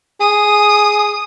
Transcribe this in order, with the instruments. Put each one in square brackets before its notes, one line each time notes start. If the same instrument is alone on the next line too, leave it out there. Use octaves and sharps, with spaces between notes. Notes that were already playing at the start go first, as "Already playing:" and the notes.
[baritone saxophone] G#4 [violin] D#6